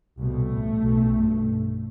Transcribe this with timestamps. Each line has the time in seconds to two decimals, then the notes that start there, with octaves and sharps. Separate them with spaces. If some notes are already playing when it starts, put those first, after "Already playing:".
0.19 C2 B2 A3
0.51 A1 A2
0.83 B1 B2
1.15 G2